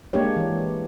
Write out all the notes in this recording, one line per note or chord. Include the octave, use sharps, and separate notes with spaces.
G#3 A#3 D4 G4 C#5
E3